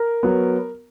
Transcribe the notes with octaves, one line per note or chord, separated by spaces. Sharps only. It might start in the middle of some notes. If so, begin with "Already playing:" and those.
Already playing: A#4
F#3 B3